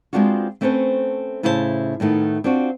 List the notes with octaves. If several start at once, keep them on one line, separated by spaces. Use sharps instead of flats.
G#3 B3 C4 D4 F4 F#4
A3 C4 C#4 A4 B4 C5
A2 C#3 E4 C5 D5 A5
A2 D#3 A3 B3
C4 D4 F4 F#4